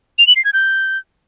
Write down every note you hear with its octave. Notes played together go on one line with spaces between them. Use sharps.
F7
F#7
C7
G#6
G6